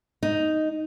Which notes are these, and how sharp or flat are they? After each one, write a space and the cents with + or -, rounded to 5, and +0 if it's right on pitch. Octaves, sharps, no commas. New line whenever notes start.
D#4 +0